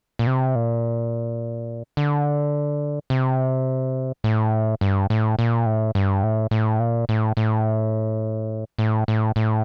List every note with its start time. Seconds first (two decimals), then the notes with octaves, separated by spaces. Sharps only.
0.19 A#2
0.27 C3
0.55 A#2
1.97 D3
3.10 C3
4.24 A2
4.81 G2
5.10 A2
5.39 A#2
5.66 A2
5.95 G2
6.23 A2
6.51 A2
6.80 A#2
7.09 A2
7.37 A2
8.79 A2
9.08 A2
9.36 A2